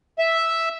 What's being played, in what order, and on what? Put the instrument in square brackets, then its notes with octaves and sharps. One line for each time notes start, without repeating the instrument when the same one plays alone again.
[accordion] E5